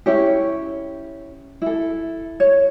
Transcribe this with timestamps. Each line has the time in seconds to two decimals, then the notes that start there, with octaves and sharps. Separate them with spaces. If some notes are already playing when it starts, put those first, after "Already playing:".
0.06 C#4 E4 G4 C#5
1.62 E4 A4
2.40 C#5